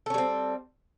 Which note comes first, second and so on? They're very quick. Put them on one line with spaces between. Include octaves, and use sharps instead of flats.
A4 C#4 G3 C4